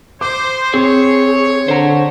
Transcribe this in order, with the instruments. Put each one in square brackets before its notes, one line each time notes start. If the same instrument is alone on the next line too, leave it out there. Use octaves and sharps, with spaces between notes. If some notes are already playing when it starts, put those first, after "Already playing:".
[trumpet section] C5 [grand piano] D6
[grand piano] C4 [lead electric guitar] G#4 [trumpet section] C#5
[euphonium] D3 [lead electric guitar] C5 A#5